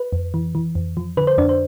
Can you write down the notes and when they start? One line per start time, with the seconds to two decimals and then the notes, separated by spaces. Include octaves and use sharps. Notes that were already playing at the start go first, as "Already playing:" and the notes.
Already playing: B4
0.13 F2
0.34 E3
0.55 E3
0.75 F2
0.97 F3
1.17 D3 B4
1.27 C5
1.38 F2 D4 D5
1.49 C5